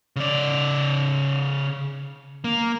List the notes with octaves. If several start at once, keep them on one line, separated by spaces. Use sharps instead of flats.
C#3 D5
A#3